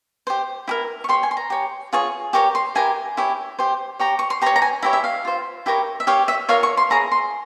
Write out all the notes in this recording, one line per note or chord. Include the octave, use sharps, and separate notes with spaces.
G4 C5
E4 G4 A#4
C#6
G4 C#5 C6
G#5
C6
A#5
G4 C#5
F4 G#4 C#5
G4 A#4 C#5 C#6
C6
E4 G4 A#4 G#5
E4 G4 C#5
G4 C5
G4 C#5 A#5
C#6
C6
G4 C#5 A#5
A#5
G#5
E4 G4 C#5 E5
E5
F5
F4 C5
E4 G4 A#4 C#5
E5
G4 C#5 F5
E5
F4 A#4 C#5 F5
C#6
C6
E4 G#4 C#5 A#5
C6